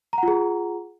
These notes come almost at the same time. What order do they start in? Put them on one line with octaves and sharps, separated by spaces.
A#5 F#5 F4 G#4